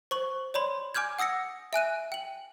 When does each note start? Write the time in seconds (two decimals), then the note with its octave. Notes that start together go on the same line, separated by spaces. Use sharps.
0.11 C5 C#6 F#7
0.54 C#5 D5 B5 C6
0.94 G#5 D6 F6 G6 G#6
1.19 F#5 D#6 E6 A#6 C#7
1.73 E5 G#5 F#6 D#7
2.12 G5 F#7